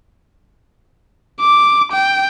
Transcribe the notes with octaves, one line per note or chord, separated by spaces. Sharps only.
D6
G5